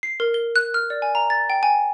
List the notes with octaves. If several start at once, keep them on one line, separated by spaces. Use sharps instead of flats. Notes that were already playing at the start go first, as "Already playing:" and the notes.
C7
A#4
G7
F#6
F6
D5
G#5
A#5
A6
G5
G#5